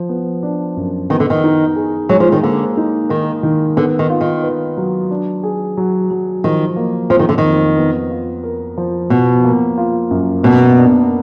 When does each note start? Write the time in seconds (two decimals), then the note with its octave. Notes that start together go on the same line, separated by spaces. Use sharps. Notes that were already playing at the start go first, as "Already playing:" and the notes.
Already playing: F3
0.09 B3
0.43 D4
0.77 F#2
1.10 D#3 B3
1.20 D3
1.30 D#3
1.44 D#4
1.76 G#4
2.09 F#3 G#3
2.20 F3
2.32 D#3
2.43 D3 A#3
2.77 D#4
3.09 D#3 A#4
3.43 D#3
3.77 D3 B3
3.99 D#3
4.10 F4
4.21 D#3
4.44 B4
4.77 F#3
5.10 D4
5.43 G#4
5.77 F#3
6.11 F#3
6.44 D#3 F3
6.76 A#3
7.10 F2 F3
7.19 D#3
7.29 D3
7.38 D#3
7.44 F2
7.77 B3
8.10 F4
8.43 A#4
8.77 F3
9.10 B2 F3
9.44 A#3
9.78 F4
10.11 F#2
10.43 B2 A#3
10.77 D4